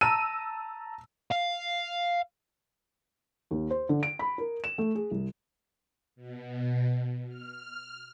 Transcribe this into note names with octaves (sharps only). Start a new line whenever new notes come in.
A5 A#5 E6 D#7
F5
D#2
C5
D3
D7
B5
A#4
E7
A3
G#4
C2
B2
F6